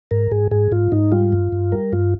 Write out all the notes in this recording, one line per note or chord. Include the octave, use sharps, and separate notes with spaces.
G#2 A#4
G#2 G#4
G#2 G#4
G#2 F4
G#2 D#4
G3 F4
G2
G2
G3 A#4
G2 F4